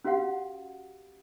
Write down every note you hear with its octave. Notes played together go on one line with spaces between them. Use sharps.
C#4 F#4 G4 F5 F#5